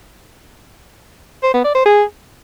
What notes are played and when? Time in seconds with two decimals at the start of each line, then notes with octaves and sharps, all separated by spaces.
1.43 C5
1.54 B3
1.64 D5
1.75 C5
1.86 G#4